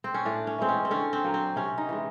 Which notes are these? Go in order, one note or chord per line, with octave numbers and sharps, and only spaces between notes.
C4
C#4
A2 D4
C#4
E3 G#3 C4
C#4
C4
D3 C#4
C4
F#3 A#3
C4
C3 C#4
D#4
E3 G#3